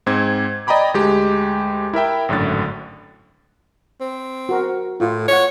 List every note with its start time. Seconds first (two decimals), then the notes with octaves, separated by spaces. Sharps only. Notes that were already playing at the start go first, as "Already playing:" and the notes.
0.06 G#2 C4 G#6
0.67 D5 D#5 G5 A#5 B5 D6
0.94 D2 G#3 G4
1.93 E4 A#4 E5 G5
2.29 G#1 F#2 A2 D3 A6
4.01 C4
4.49 F#4 A#4
5.00 A2 F4
5.28 C#5 F#5 C#6